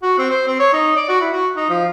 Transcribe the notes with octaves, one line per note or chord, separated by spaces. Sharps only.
F#4
C4
C5
C4
C#5
D#4
D5
F#4
E4
F#4
D#4
F3